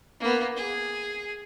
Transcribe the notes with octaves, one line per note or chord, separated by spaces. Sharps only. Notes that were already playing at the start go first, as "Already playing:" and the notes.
A#3 B3
G#4